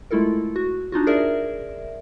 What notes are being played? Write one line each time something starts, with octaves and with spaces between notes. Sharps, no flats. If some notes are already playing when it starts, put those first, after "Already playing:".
G#3 A3 E4 F4 A4 A#4
F#4
D4 D#4 F4 F#4
G#4 A#4 D5 E5